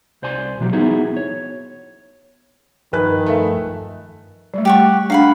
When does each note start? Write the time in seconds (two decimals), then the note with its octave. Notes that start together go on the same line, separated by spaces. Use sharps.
0.22 C2 C5 D5 G#5 C6
0.60 B2 E3 F#3 G3 G4
0.73 B3 D#4 E4 F#4 G#4
1.17 C#5
2.93 G2 D#3 F3 B4 G#5 F#6
3.26 A3 E5
4.54 G3 A3
4.65 G4 F#5 C#6
5.10 D4 F5 F#5 B5